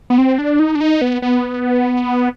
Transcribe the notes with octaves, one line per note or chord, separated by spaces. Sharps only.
B3
C4
D4
D#4
D4
D#4
B3
B3